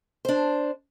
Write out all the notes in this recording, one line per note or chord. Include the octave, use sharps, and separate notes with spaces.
D4 C5